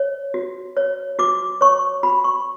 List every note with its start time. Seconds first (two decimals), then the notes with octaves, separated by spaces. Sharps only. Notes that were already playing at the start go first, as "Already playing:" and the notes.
Already playing: C#5
0.34 F#4
0.77 C#5
1.19 F#4 D6
1.61 C#5 C#6
2.03 F#4 B5
2.24 C#6